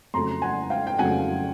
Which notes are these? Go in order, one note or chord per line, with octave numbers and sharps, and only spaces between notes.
F2 C#3 F#3 A3 A#5 C6
F#5 G#5
F5 G5
G5
F2 C#3 F#3 A3 F#5 G#5